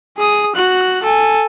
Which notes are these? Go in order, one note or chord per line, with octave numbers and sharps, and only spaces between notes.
G#4 D#6
F#4 F#6
A4 G#5